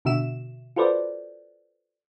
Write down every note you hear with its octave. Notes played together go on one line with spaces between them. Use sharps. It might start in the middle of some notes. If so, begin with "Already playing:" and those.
B2 D3 F#4 E5 E7
F4 F#4 A4 B4 C5 D5